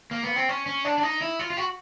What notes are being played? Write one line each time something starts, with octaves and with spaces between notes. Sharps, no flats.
A#3
B3
C4
C#4
C#4
D4
D4
D#4
E4
F4
F4
F#4